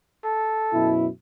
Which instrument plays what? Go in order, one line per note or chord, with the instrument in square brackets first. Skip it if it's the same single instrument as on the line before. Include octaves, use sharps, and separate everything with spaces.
[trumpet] A4
[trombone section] F#2 B2 E4